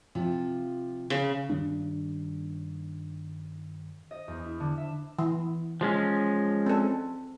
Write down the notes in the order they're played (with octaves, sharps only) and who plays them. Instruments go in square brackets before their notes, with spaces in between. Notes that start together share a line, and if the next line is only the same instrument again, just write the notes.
[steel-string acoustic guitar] C3 F3 F4
[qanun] C#3
[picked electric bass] G2 D#3 G3 D4
[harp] D#5
E2
E4
D3
E5
[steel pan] E3
[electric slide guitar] F3 G#3 C#4
[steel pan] C4 A4